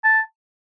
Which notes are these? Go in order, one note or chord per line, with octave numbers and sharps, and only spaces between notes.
A5